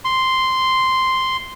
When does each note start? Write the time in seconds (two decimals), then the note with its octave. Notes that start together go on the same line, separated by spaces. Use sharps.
0.05 C6